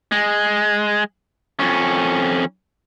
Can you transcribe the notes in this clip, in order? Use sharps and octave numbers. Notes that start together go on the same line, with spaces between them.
G#3
F2 C#4